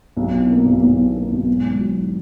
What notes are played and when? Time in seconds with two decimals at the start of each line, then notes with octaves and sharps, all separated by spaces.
0.17 B1
0.32 B2
0.50 A#3
0.66 B1
0.82 B1
0.98 B2
1.15 A#3
1.32 B1
1.48 G#1
1.64 G#2
1.80 F#3